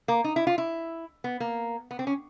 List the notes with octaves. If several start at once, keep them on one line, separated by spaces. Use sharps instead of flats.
A#3
D#4
E4
F4
E4
B3
A#3
B3
C4
C#4